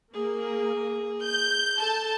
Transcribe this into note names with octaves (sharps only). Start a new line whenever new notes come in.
A#3 G#4
G6
A4 A5